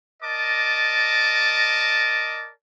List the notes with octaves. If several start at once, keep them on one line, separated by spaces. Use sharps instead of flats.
A#4 D5 D#5 A5 D6